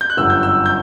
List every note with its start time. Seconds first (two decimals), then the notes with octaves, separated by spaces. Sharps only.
0.01 G6
0.10 F#6
0.17 G1 F#2 D3 G3 E6
0.30 G6
0.43 E6
0.66 G6